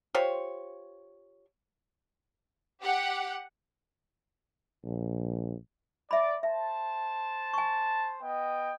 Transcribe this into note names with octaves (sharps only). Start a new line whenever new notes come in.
F4 G4 C5 C#5
G4 F#5
A#1
D5 E5 B5
C5 E5 A5
G#5 C#6
B3 D#5 G5